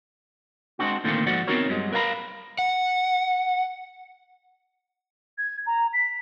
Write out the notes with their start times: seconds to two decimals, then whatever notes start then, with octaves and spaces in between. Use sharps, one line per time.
0.79 G#3 A#3 C4 D4 F#4
1.04 A#2 D3 D#3 A3 A#3 C4
1.26 G#2 F3 F#4 C5 D5 F#5
1.47 B3 C4 D#4 F#4 A#4 C#5
1.69 G2 F#3 G#3
1.93 A#4 B4 F5 G#5 A#5 B5
2.59 F#5
5.38 G#6
5.66 A#5
5.93 B6